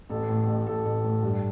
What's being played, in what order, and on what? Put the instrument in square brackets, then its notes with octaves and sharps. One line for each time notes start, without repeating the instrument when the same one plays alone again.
[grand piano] A1 A4
A2
A1
A2 A4
A1
A2
G2